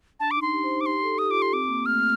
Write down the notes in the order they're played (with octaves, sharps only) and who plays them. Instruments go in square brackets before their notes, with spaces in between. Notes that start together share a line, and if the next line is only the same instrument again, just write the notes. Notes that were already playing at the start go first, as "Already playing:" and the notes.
[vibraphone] D4 [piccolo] A5
[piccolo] D6
[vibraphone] D#4
[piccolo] C6
[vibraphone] G4
C5
D#4
[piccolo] D6
[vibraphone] G4 [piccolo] C6
[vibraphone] A4
[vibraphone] G4 [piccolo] D#6
[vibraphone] F4
[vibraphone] G4 [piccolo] D6
[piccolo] C6
[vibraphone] C4 [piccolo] D6
[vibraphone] A#3
[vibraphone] A3 [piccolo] F6